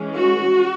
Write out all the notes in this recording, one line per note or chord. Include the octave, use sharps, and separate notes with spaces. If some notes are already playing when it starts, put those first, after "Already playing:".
Already playing: E3 G#3 C#4
F#4